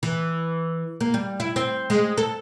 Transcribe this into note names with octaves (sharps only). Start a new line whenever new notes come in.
E3
A#3
G3
E4
C4
G#3
A4